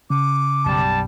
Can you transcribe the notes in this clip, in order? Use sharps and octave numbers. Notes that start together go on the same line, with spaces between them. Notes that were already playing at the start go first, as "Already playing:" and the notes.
C#3 D6
B1 F#2 G3 A5